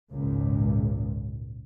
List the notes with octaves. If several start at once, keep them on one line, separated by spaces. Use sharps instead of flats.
G#1 C#2 A#2